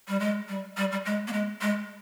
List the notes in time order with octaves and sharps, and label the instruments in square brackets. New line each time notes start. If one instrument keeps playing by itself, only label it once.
[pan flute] G3
G#3
G3
G3
G3
G#3
A#3
G#3
G#3